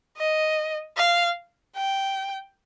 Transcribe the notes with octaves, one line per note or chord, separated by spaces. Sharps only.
D#5
F5
G5